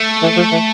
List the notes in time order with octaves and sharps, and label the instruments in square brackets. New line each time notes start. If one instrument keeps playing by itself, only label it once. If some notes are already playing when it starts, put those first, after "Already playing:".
Already playing: [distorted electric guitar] A3
[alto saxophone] E3
F3
E3